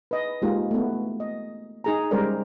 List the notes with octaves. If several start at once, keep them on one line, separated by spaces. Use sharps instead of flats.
B4 D#5
G#3 A#3 D#4 F4 G4
A3 B3
D#5
D#4 G#4 A#5
G3 G#3 C#4 A#4 C5 D5